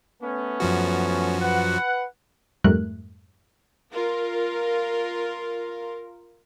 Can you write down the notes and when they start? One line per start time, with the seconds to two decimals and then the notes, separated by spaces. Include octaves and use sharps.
0.22 A3 B3 C#4
0.60 F#2 F3 F#4
1.41 B4 F#5
2.64 F2 G#2 G3 A3 A#4 F#6
3.92 F4 A#4